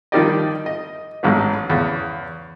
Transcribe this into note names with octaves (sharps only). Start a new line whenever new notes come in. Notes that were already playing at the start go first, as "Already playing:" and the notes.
D#3 F3 G3 G4 D5 D#5
D#5
A1 G#2 F#3 B3
E2 C#3